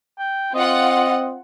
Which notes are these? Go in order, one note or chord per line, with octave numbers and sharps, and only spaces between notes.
G5
C4 F4 D#5 F#5